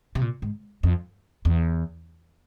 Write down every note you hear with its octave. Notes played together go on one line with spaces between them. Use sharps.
C3
A#2
G#2
F2
E2